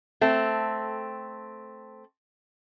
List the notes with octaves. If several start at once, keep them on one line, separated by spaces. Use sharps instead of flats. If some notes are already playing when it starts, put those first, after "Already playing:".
A3 C4